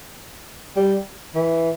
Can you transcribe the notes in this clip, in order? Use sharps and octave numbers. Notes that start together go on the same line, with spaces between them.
G3
E3